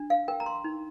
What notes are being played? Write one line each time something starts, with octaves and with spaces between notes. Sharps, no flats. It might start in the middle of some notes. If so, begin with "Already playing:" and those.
Already playing: D4
F5
A#4 G5
A#5
C6
D#4